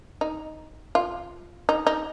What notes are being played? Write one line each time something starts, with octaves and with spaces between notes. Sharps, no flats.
D#4
F4
D#4
D#4